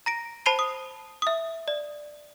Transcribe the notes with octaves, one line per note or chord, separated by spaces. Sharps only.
A#5 A#6 D7
C5 A5 B5 C7 D#7 G7
D#6
E5 D#6
D5